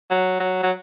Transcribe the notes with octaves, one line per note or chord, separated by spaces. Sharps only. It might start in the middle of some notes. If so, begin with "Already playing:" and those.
F#3
F#3
F#3